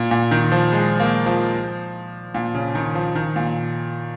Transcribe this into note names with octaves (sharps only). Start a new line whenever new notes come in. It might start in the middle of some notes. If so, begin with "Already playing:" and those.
Already playing: A#2
A#2
D#3
F3
G#3
A#3
F3
A#2
C#3
D#3
F3
D#3
A#2